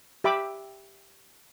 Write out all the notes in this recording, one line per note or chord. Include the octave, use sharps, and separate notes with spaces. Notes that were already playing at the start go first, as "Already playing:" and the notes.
G4 E5 B5 D6